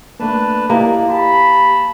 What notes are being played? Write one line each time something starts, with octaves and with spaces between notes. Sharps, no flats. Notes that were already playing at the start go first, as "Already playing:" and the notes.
A3 A#3 D4 B4 A5
A#3 E4 G4 D5 D#5
G4 A5 B5